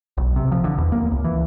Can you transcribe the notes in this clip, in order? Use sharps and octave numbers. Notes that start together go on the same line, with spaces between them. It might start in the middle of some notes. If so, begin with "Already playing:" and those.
B1
C3
F3
D3
E2
A#3
C#2
E3